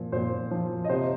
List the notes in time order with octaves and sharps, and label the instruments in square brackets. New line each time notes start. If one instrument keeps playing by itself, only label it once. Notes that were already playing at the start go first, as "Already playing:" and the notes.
Already playing: [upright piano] A#2 F3
A#2 C5
F3 C5
D#5
C3 C5